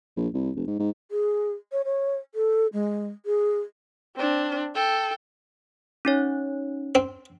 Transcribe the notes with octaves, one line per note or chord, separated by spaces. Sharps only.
A#1
C2
F1
G#2
G#2
G#4
C#5
C#5
A4
G#3
G#4
C4 D4
A4 G5
C#4 D#4 C#5
C4